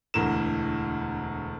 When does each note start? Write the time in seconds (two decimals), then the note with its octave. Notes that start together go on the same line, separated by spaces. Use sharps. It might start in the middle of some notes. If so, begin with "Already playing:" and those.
0.14 E1 D2 E3 A#4 E7